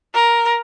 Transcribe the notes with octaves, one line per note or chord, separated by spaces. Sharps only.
A#4